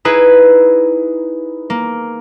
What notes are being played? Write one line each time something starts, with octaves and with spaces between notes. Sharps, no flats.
D#4 E4 G#4 B4
A#3